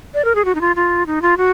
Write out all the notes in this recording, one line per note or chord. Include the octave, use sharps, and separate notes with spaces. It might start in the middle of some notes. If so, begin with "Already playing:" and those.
D5
A#4
G#4
F#4
D#4
F4
F4
D#4
F4
F#4